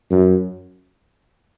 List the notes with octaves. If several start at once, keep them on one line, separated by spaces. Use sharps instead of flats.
F#2